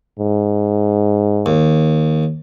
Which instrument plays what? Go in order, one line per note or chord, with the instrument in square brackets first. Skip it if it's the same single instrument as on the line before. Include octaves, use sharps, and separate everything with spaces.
[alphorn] G#2
[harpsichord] D#2